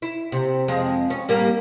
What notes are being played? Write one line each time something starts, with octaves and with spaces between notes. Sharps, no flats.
E4
C3
F2 G#3
C#4
A2 G3 A#3